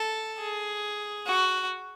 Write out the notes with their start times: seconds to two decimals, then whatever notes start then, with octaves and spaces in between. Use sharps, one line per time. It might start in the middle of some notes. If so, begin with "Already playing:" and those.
Already playing: A4
0.39 G#4
1.26 F#4